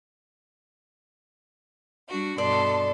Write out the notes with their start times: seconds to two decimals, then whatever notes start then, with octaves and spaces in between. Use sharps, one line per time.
2.08 G3 D4 F#4
2.38 G2 B2 A4 D5 C6